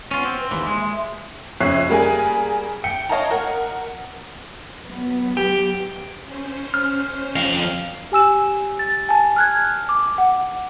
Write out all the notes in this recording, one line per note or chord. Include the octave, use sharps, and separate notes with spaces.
B3 C#4 F4
C4
B4
D#2 E3 C6
G#3
E5
F2 C#3 C#5 E5 F#6 C7
G3 A#3 G#4 G#5
G5 C#7
C#5 D#5 F5 G5 A5 A#5
A#4 F#5
F#3 B3
G4
C#4 C5
F6
F2 F5
G4 G#5 E6 E7
A6
G#5 A5
F6 F#6 G#6
D6
F#5